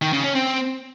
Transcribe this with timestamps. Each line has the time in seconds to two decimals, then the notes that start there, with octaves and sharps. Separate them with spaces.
0.02 D#3
0.13 C#3
0.24 C#4
0.35 C4